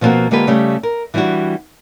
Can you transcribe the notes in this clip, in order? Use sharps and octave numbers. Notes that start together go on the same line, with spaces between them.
B2 F3 G3 A#3 C4 F#4
D3 G#3 A#3 F4 G4 B4
C#3 G3 A3 G4
A#4
E3 G3 D4 E4 F#4